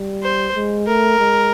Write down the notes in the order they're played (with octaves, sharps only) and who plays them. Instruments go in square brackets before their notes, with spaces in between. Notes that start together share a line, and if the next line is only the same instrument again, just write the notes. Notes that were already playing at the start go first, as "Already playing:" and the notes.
Already playing: [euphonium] G3
[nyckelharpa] C5
[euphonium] G#3
[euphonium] A3 [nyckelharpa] A#4
[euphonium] G#3